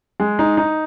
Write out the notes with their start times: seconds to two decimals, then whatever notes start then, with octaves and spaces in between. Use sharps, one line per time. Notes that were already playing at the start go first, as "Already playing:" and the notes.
0.20 G#3
0.39 D#4
0.57 D#4